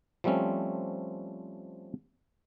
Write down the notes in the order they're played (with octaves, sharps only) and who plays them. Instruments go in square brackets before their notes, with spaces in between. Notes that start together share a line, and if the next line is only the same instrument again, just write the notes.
[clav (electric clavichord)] F3 G3 A3 C4 C#4